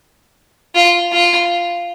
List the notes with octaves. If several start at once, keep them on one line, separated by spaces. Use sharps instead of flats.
F4
F4